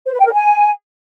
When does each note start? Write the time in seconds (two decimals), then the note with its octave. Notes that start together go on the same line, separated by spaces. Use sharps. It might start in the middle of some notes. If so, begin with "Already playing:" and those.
0.06 C5
0.12 B4
0.19 G5
0.26 A#4
0.33 G#5